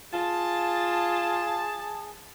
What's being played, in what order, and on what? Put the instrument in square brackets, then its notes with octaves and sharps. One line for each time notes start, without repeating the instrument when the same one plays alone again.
[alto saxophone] F4 [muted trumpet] G#4 [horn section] A5